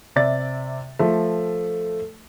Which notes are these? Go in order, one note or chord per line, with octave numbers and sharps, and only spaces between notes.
C3 D5 E5 A6
F3 A3